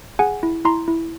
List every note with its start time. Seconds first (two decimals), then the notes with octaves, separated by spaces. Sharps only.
0.19 G#4 F#5 G#5
0.43 E4
0.65 E4 A#5 C6
0.88 E4